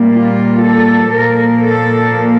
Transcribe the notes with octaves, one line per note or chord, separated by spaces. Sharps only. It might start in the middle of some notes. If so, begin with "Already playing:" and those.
Already playing: A#2 G3 A#3
F4
A4
A#2 F3 A#3 A#4
A4